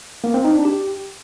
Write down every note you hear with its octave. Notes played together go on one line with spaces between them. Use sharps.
A#3
C4
D#4
D4
G4